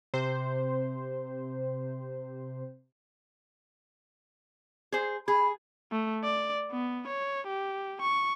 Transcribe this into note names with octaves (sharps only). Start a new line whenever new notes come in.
C3 C5
G#4 C5
G#4 B5
A3
D5
B3
C#5
G4
C#6